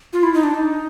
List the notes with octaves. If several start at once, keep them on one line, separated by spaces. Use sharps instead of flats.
F4
E4
D#4
D4
D#4